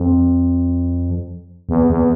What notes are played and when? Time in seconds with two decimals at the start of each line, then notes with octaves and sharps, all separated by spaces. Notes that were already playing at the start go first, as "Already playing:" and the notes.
Already playing: F2
1.69 E2
1.90 E2